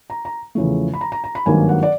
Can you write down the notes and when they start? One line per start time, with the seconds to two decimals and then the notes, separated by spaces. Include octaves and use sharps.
0.10 A#5
0.25 A#5
0.55 E2 C#3 F3 A3
0.94 B5
1.01 A#5
1.12 A#5
1.24 A#5
1.35 B5
1.46 G#1 G2 D#3 F#3 A#3 G#5
1.69 F#5
1.83 D5